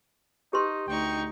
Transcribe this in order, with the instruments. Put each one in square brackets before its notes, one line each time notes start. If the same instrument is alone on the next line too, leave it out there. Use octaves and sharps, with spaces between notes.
[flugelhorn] D#4 [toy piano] G4 B4 C6
[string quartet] D2 D#4 C#6 [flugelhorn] G5